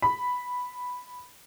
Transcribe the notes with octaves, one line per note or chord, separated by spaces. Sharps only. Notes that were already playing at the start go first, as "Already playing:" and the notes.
B5